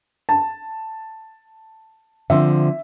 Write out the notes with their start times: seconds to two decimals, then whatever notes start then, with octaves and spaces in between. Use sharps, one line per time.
0.29 A5
2.30 D3 F3 C4 E5